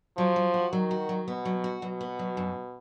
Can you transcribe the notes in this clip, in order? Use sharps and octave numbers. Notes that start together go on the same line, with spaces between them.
F3 F#3
F#3
F#4
D#3 F#3
F#4
F#3
B2 B3
F#3
F#4
B2 F#3
B3
F#3
F#2